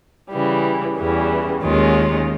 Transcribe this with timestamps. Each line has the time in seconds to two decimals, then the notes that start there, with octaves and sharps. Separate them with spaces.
0.32 C#3 E3 G3
0.98 E2 C#3 E3 G3
1.64 D#2 D#3 G#3 C#4 F4